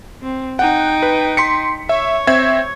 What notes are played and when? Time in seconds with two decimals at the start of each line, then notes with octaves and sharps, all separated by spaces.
0.23 C4
0.59 D#4 F#5 G5
1.03 B4
1.37 C6 B6 C#7
1.89 C#5 E5
2.27 C4 E5 G#6